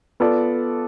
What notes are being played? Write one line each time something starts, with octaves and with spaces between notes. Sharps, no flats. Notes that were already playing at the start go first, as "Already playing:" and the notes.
B3 F4 A4 D5